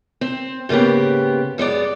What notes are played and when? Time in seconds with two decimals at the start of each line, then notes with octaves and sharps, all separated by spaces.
0.21 C4
0.69 G#2 C#3 A#3 B3 G4
1.58 F#2 G#3 B3 D5